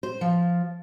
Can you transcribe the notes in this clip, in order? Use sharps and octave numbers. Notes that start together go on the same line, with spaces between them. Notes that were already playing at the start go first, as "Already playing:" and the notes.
C5
F3